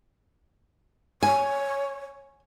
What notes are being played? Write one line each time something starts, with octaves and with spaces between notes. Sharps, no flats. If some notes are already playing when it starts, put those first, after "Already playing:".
C#5 G#5